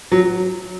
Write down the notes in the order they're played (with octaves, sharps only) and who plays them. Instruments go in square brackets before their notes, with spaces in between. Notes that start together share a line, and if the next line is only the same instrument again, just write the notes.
[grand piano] F#3